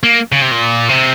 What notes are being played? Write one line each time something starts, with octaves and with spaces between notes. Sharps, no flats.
A#3
C#3
C3
A#2
C3